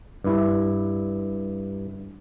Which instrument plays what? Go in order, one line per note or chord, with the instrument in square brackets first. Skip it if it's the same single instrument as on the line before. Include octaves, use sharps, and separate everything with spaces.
[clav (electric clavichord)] G2 E4